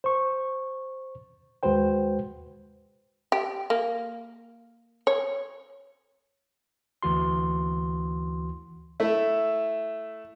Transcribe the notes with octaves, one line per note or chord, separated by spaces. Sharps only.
C5 C#6
D#2 G#3 F#4 B4 C5 G5
G4
A#3
C#5
D2 E3 F#4 C6
A3 E4